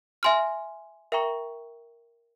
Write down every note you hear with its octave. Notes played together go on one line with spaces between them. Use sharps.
E5 G#5 C6 F6
A#4 E5 G5 A#5 C#6